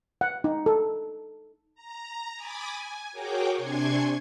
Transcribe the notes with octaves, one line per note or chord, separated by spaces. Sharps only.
F#5
D#4
A4
A#5
G#5 B5 D6 D#6 A6
G#5
F#4 G#4 A#4 C#5 G5 D6
C3 D4 G#5 C6 C#6 G#6